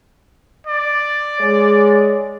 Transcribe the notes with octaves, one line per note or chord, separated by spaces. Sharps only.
D5
G#3 C#5